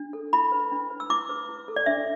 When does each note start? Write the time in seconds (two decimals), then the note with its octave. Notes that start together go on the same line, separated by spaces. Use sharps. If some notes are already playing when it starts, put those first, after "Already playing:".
Already playing: D4
0.13 A4
0.33 E4 B5
0.52 B4
0.72 D4
0.90 B4
1.00 E6
1.10 E4 D6
1.29 B4
1.49 E4
1.68 A4
1.76 D5
1.86 D4 E5